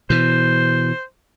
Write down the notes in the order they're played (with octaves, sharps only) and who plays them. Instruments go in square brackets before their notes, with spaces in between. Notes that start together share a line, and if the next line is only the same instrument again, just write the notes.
[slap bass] B2 E3 [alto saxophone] C5